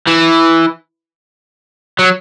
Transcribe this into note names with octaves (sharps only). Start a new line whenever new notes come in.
E3
F#3